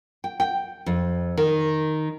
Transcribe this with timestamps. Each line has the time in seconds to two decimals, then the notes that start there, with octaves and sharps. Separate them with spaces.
0.24 G5
0.40 G5
0.86 F2
1.37 D#3